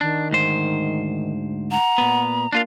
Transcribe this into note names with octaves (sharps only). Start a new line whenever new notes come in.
D#3 D4
D2 G#2 C5
F#5 A#5
A#2 B3
A#3 D4 F4 F5